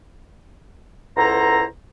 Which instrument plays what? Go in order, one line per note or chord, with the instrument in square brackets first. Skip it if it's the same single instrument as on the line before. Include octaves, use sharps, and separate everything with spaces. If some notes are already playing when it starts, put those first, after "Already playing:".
[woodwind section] C#2 B3 E4 A4 C5 A#5